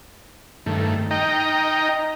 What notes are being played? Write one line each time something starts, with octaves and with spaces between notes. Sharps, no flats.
G2 D#3 A3
D#4 D#5 G5 A#5